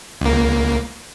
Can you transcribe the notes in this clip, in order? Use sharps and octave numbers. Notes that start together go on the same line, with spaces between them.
C#2 A#3